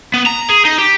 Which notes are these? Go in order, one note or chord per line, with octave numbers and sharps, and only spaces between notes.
B3
A#5
G#4
D#4
G4